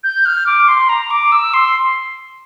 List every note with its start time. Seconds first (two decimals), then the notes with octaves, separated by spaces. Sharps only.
0.04 G6
0.26 F6
0.47 D6
0.68 C6
0.89 A#5
1.10 D6
1.32 E6
1.54 C6